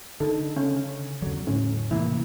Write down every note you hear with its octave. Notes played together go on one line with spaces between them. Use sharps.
D3 D#4 A4
C#3 C#4
E2 D3 F#3
A2 C#4
C3 E3 A#3 E4